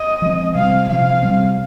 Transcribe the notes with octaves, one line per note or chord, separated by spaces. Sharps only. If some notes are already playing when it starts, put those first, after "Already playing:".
Already playing: D#5
F3 G#3 C4
C3 G3 C4 F5
C3 F3 C4 F5
C3 G3 C4